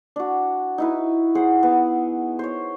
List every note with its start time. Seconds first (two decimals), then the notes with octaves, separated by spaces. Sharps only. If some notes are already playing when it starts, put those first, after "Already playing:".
0.16 D4 F#4
0.78 D#4 E4 B4
1.35 G#4 C5 F#5
1.63 B3
2.39 C5 C#5